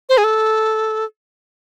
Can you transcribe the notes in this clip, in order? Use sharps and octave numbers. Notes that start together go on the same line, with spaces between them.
C5
G#4
A4